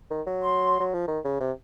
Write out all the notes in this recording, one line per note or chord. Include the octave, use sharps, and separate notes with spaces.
D#3
F#3
C6
F#3
F3
D#3
C#3
C3